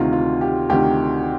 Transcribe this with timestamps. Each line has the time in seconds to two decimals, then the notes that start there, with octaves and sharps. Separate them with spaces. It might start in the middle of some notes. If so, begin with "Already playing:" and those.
Already playing: D2 C3 D#3 F4
0.13 F4
0.41 G4
0.69 D2 C3 D#3 G4